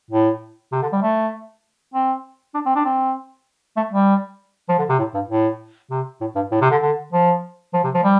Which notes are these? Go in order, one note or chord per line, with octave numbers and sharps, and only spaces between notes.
A2
C3
D3
G3
A3
C4
D4
C4
D4
C4
A3
G3
F3
D3
C3
A2
G2
A2
C3
A2
G2
A2
C3
D3
D3
F3
F3
C3
F3
G3